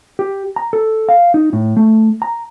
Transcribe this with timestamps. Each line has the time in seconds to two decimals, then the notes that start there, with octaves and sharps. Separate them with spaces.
0.19 G4
0.56 A#5
0.73 A4
1.09 F5
1.34 D#4
1.53 A2
1.77 A3
2.22 A#5